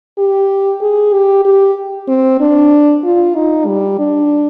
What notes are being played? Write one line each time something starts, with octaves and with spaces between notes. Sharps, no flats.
G4
G#4
G4
G4
C4
D4
F4
D#4
G3
D4